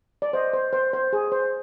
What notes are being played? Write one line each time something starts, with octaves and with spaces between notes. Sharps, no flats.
D5
C5 D#5
C5
C5
C5
G#4
C5